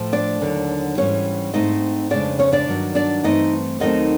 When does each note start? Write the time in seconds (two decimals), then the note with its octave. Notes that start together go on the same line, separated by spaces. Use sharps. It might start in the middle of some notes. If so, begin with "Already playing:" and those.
Already playing: A2 F3 A3
0.12 D4 D5
0.41 D#2 D3 F#3
0.97 G#2 E3 G3 C#4 C#5
1.53 G#2 E3 A3 C4 D#4 D#5
2.10 F3 G#3 D4 D5
2.14 F2 C#3
2.39 C#4 C#5
2.52 D4 D5
2.68 G2 D#3 F#3
2.95 D4 D5
3.23 G2 E3 A3 C4 D#4 D#5
3.80 D#2 D#3 F#3 A3 C4 D#4 D#5